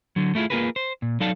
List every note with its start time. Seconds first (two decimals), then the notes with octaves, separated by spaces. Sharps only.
0.16 D3 F#3
0.35 A3 E4 F4 G#4
0.50 A#3 C4 F4 G#4 A#4 B4
0.76 C5
1.02 A#2
1.20 F#3 D#4 A4 D5 F5 A5